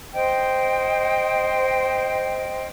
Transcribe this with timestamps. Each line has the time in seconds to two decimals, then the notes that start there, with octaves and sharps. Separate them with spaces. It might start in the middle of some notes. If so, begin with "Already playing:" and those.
0.13 C5 D#5 G5